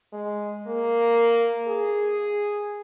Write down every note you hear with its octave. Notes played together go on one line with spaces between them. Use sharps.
G#3
A#3
G#4